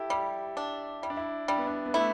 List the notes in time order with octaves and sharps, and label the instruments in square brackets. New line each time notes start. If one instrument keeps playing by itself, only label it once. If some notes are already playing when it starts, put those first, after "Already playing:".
Already playing: [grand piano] E4 G4 A4
[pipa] G3 [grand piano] G4
[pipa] D4
[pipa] G3 [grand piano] E4
[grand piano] D4
E4
[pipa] G3 [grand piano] D4
[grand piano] B3
D4
B3
[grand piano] A3 [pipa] E4